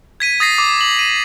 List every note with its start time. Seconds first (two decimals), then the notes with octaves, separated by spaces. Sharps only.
0.20 G#6 B6 D#7
0.40 D#6 A6 A#6 C7
0.58 D6
0.81 F#7
0.99 D#7